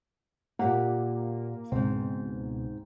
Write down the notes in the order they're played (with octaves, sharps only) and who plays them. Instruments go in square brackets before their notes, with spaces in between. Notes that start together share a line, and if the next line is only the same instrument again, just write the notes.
[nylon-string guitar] A#2 G4 F#5 [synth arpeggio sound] A#3
[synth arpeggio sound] C#2 B2 [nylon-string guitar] G#2 C4